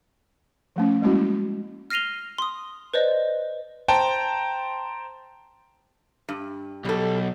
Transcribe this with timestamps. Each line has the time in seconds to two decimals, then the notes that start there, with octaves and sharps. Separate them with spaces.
0.76 F3 A3 C#4
1.02 G3 G#3 A#3 C#4 E4 F#4
1.90 F6 A#6 C7 D#7 F7 G7
2.38 C6 D#6
2.94 B4 C5 D5 D#5
3.88 C5 G5 A5 A#5
6.29 G2
6.85 B1 G3 A4